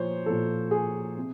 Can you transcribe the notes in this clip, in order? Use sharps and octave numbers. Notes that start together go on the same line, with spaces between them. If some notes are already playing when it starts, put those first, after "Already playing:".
Already playing: A#2 F3 C5 C#5
A#2 F3 A4
G#4
C3